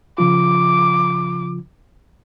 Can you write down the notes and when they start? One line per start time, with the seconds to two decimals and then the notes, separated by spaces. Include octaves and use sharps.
0.18 C#3 F3 F4 D6